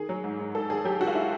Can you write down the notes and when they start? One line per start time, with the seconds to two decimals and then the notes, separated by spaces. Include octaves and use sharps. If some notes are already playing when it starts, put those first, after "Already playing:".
Already playing: D#3 G#4
0.09 F#3
0.24 G#2
0.39 G#2
0.55 G#2 A4
0.70 D#3 G#4
0.84 F#3 G4
1.00 D#3 F#4
1.07 F4
1.15 E4